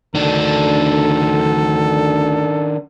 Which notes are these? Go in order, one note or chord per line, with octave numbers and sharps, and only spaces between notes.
D2 D#3 D4 A4